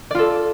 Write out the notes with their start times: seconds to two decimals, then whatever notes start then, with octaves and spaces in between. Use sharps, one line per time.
0.11 D5
0.15 F4
0.19 A4